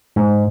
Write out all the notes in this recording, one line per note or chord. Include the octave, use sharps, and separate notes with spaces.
G#2